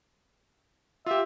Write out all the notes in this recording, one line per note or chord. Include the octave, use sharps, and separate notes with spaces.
F4 G4 E5